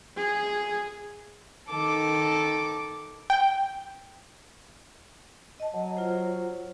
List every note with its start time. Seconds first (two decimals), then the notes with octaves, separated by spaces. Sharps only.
0.17 G#4
1.70 D#3 A4 D6
3.30 G5
5.60 D#5 A5
5.73 F#3
5.97 F4 C5